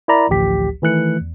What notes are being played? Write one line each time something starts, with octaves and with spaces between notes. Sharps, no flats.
E4 A#4 D5 A#5 B5
A1 D2 F3 G4 B6
D#3 E3 A3 F#6 C#7
E2